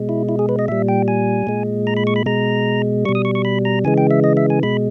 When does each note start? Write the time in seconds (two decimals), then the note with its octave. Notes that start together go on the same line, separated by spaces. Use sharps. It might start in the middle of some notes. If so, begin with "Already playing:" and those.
Already playing: B2 G#3
0.09 E4
0.29 E4
0.39 G#4
0.49 B4
0.59 D#5
0.68 A#2 G3 E5
0.88 G5
1.08 G#5
1.47 A#2 G#3
1.87 A#5
1.97 B5
2.07 C#6
2.16 B5
2.26 B2 G#3 A#5
3.05 B2 G3 C#6
3.15 D#6
3.25 C#6
3.35 C#6
3.45 B5
3.65 A#5
3.84 C#3 E3 G#3 G#5
3.98 G5
4.11 E5
4.24 D#5
4.37 E5
4.50 G#5
4.63 B2 G#3 B5